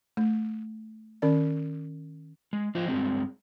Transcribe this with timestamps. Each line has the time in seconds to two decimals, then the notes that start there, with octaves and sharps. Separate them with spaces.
0.17 A3
1.22 D#3 C#4 D5
2.53 G#3
2.75 F3 F4 C5 D#5
2.89 G2 A#2 G#3 C4